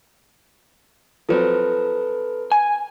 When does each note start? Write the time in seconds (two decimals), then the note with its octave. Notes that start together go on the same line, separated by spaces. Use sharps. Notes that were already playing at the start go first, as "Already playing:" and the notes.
1.29 F3 F#3 C4 A4 B4
2.52 G#5